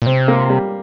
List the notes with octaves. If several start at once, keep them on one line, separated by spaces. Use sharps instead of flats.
A#2
C3 C4
A#3
G3